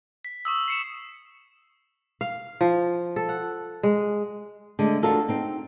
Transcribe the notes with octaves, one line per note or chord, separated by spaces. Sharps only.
B6
C#6 D#6 E6
C7 C#7 E7
F5
F3
A4
F#5
G#3
D3 G#3 A3
D4 F4 F#4 A4 A#4
C4 D#4